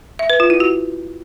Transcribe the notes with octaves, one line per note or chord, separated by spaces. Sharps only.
E5
B4
F4
E4
F#4